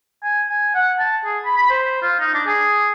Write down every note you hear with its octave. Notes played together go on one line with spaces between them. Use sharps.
G#5
G#5
F#5
A5
G#4
B5
B5
C5
F4
D#4
D4
G#4